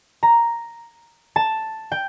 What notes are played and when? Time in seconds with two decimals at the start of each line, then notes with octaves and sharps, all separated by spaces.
0.23 A#5
1.36 A5
1.92 G5